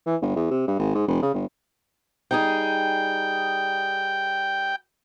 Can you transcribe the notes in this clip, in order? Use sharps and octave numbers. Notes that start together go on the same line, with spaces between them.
E3
G1
E2
C3
G2
G#1
G#2
F1
C#3
G1
G3 D#4 G#4 G5